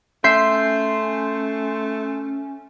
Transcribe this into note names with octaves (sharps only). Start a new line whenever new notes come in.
A3 C#4 E5 C6 G6 C7